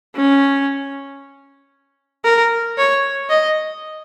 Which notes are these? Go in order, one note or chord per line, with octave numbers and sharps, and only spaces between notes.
C#4
A#4
C#5
D#5